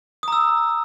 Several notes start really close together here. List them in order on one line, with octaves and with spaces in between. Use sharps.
D#6 A#5 E6